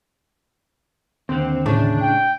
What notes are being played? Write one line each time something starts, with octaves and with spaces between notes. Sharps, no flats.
D#2 D3 C4
A2 C#3 D4
G5